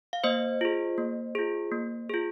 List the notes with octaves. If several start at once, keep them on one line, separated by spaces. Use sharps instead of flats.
F5
A#3 C5 D#5
F4 G#4
A#3
F4 G#4
A#3
F4 G#4